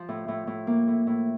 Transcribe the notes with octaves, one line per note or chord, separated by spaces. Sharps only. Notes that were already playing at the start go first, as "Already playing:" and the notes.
Already playing: F3
A2
A2
A2
A#3
A2
A2